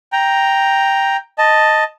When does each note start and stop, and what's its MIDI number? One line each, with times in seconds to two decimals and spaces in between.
0.12 1.17 79
0.12 1.17 82
1.38 1.84 75
1.38 1.84 81